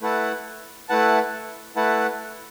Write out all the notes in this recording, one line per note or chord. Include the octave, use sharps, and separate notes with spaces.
A3 E4 B4 F#5 A5
A3 E4 B4 F#5 A5
A3 E4 B4 F#5 A5